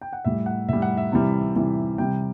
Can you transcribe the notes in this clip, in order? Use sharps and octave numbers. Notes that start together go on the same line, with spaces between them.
G5
F#5
A2 G3 E5
F#5
A2 G3 E5
F#5
E5
C3 E3 G3
C3 E3 G3
C3 G3 G5